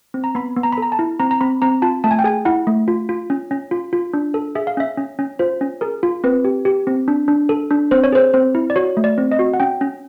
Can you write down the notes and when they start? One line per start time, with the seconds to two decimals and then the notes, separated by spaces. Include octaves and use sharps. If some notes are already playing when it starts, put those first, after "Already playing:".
0.14 C4
0.24 A#5
0.35 B3 B5
0.57 B3
0.63 A#5
0.72 B5
0.78 A4 A#5
0.92 A5
0.99 E4
1.20 C4 A#5
1.31 A#5
1.41 C4 B5
1.62 C4 A#5
1.82 F4 A5
2.04 A3 A5
2.11 G#5
2.19 G5
2.24 G#4 G#5
2.45 E4 F#5
2.67 A3
2.88 F4
3.09 F4
3.30 C#4
3.51 C#4
3.71 F4
3.93 F4
4.14 D4
4.34 A4
4.55 G#4 E5
4.67 F5
4.77 C#4 E5
4.98 C#4
5.19 C#4
5.39 F4 C5
5.61 C#4
5.81 G#4 A#4
6.03 F4
6.24 C4 B4
6.45 G4
6.65 G4
6.87 C4
7.08 D4
7.28 D4
7.49 A4
7.70 D4
7.91 C4 C5
8.04 C#5
8.12 G#4 C5
8.33 C4 C5
8.55 E4
8.70 D5
8.76 F#4 C#5
8.97 A3
9.04 D5
9.18 C4
9.32 D#5
9.39 F#4
9.54 F#5
9.60 C#4 G5
9.81 C#4